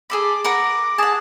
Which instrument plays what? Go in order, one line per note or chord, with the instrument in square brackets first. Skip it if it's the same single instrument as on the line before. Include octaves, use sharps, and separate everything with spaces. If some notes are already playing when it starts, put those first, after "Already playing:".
[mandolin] G#4 A4 B5 [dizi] D6
[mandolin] A#4 B4 F#5
[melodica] G#4 [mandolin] F#5 A5